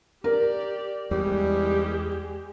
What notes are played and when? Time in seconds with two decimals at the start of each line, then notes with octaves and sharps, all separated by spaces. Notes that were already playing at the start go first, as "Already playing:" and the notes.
0.24 G4 A#4 D5
1.11 E2 G3 G#3 G4